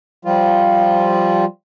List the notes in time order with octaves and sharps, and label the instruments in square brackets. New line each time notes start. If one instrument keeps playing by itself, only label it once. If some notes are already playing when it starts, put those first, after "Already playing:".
[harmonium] F3 G3 F4